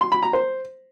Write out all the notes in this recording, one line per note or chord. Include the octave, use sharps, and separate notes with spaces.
C6
B5
A#5
C5